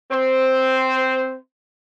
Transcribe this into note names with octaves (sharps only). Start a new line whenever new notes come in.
C4 C5